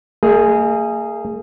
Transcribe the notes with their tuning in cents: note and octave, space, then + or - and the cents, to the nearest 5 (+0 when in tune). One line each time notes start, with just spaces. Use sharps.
A#3 -45 G#4 +0 D#5 +0